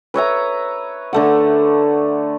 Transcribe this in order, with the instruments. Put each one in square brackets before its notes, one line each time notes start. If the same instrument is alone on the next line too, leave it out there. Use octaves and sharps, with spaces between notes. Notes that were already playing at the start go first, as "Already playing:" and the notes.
[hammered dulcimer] B4 C#5 E5 A#5
D3 A3 F#5